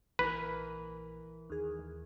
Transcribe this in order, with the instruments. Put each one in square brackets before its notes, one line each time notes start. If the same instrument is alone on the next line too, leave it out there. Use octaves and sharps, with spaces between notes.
[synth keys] A#1 [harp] E3 A#4 [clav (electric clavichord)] B4 [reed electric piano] B5
[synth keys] D#2 G#4